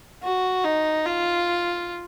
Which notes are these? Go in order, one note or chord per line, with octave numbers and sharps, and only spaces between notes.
F#4
D#4
F4